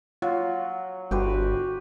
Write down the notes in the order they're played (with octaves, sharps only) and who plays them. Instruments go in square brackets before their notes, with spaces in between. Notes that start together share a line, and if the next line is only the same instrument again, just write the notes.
[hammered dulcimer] F#3 [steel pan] F4
[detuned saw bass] G1 [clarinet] F#4 [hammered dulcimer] G4 B4 C5